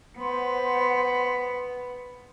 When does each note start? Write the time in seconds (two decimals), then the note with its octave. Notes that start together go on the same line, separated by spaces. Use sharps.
0.17 B3 C5 F#5 C6